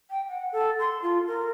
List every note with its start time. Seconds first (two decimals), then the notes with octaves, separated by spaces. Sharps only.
0.10 G5
0.28 F#5
0.52 A4
0.79 C6
1.02 F4
1.27 A#4